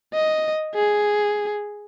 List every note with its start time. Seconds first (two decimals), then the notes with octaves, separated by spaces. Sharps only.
0.14 D#5
0.75 G#4